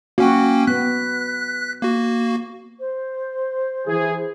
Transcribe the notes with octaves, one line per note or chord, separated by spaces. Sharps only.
A#3 C#4 F#4 G5
B3 F#6 B6
A#3 F#4
C5
E3 G#4